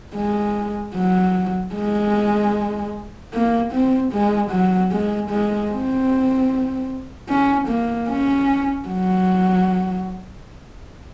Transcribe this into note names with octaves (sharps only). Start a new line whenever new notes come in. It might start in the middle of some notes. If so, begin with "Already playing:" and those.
G#3
F#3
G#3
A#3
C4
G#3
F#3
G#3
G#3
C4
C#4
A#3
C#4
F#3